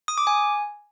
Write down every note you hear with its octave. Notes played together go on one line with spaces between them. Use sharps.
D#6
D6
G#5